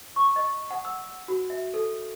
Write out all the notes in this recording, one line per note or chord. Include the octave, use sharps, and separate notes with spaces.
C#6
D#5
F#5
E6
F#4
E5
A4